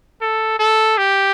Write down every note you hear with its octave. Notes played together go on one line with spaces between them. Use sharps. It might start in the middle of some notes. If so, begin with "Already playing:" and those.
A4
A4
G4